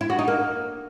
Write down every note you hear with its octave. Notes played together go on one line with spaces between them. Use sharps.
E4
F#4
D#4
A#3